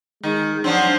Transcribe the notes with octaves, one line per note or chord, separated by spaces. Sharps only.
D#3 G#3
F3 F#3 C4 D4